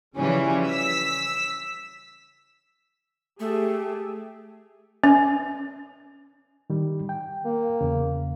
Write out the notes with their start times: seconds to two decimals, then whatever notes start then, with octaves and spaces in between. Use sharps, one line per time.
0.17 C#3 E3 F3 G3 C#4
0.67 E6 B6
3.40 A3 G4 G#4
5.04 C#4
6.70 D#3 G3
7.09 G5
7.45 A#3
7.81 E2 C#3